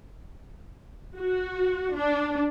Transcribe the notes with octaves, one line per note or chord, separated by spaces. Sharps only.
F#4
D4